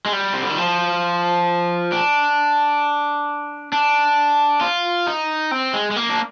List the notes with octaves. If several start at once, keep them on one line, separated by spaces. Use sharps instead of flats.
G#3
G3
C3
D3
D#3
F3
D4
D4
F4
D#4
C4
G#3
G#3
A#3
D4